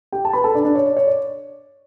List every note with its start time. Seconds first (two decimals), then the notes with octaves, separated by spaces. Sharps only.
0.12 G4 G5
0.25 A5
0.33 B4 B5
0.44 A4 A5
0.55 D4 D5
0.65 D4 D5
0.75 C#5
0.86 D5
0.97 C#5
1.07 D5